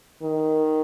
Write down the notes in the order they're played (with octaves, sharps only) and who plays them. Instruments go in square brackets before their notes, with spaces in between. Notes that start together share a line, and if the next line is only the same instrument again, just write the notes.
[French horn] D#3